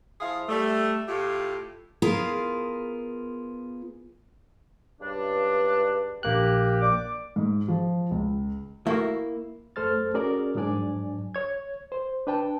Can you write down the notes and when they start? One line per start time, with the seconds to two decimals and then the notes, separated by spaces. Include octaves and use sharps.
0.21 F3 E4 G#4 F5
0.49 G3 A3
1.07 A2 F4 G4
2.02 B3 F4 G#4 A#4
5.01 C#2 G2 D4
6.23 A#1 A#3 G4 F#6
6.81 D5 D6
7.36 G#2
7.68 F3
8.11 C#2
8.87 A3 A#3 E4 F#4
9.76 F#2 A3 A4 C5 F6 A6
10.14 C#4 F#4 G#4 A#4 D5
10.55 F2 G#2 F#3 D4 D5 G#5
11.35 C#5 G#6
11.92 C5
12.27 D4 B4 G5 A5